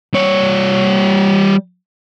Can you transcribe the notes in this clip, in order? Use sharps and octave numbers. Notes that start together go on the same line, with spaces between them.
G3 C#5